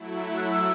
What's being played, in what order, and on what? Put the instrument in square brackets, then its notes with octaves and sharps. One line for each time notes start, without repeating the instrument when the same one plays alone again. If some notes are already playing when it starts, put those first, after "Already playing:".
Already playing: [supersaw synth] F#3 A3 E4
[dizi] F#6
E6